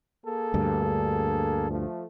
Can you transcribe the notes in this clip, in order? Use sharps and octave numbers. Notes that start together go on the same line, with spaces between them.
A#3 G#4 A4
D2 G2
F3 A3